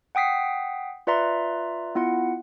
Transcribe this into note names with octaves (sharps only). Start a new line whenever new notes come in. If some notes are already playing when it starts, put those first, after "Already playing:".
F#5 G5 D#6 B6 C7
F4 B4 D5 E5 A#5 C6
B3 E4 F4 F#5